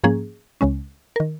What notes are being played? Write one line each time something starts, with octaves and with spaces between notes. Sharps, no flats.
G#2 F3 A#3 C#4 G#4
C#2 C#3 G#3 C#4
D#3 A#4